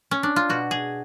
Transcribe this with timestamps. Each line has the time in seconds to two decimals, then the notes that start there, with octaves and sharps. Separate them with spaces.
0.11 C#4
0.23 D4
0.36 F4
0.49 B2 F#4
0.71 G#4